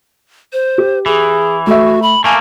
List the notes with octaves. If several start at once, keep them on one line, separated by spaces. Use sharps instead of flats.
C5
G4
E3 G#4
A3 F#4 E5
B5
A3 A#3 G#5